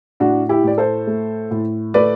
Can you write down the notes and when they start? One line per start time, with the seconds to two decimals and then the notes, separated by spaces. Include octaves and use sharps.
0.20 A2 D4 F#4
0.49 E4 G4
0.64 A2 D5
0.78 A4 C5
1.07 A3
1.51 A2
1.94 A3 B4 D5